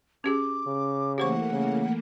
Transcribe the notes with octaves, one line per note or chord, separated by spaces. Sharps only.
C#4 G4 G#4 D6
C#3
E3 A3 A#3 G4 C5 F#5 C#6
C#3